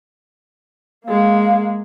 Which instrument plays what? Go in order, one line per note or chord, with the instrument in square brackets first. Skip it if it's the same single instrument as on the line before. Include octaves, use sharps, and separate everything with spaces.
[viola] G#3 A#3 [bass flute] F5